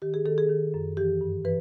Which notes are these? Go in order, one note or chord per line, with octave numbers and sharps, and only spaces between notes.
D#3 G4
G#4
D#3 A4
G#4
D#3
F#2
E3 G4
G2
E3 B4